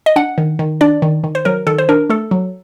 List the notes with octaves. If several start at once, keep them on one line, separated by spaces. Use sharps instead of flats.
D#5
D4 F#5
D#3
D#3
D4 D5
D#3
D#3
C5
F#3 A#4
D#3 A4
C5
D4 A#4
A3 A4
F#3